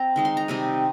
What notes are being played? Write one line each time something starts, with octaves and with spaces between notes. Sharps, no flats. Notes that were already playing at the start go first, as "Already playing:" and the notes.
Already playing: C4 A#5
D#3 G#3 D#4
C6
A#5
C3 G3 C4 D#4 G#5